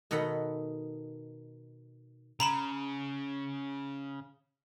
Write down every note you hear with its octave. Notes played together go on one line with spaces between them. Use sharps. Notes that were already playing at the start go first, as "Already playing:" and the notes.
B2 D#3 A4 D#5 F#5 B5
C#3 A#5 B5 E7